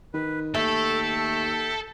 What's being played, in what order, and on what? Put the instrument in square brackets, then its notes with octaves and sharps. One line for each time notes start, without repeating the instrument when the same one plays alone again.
[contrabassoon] D#3 [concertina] B4
[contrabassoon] D#2 [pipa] A3 [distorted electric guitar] A4 [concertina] E5 G5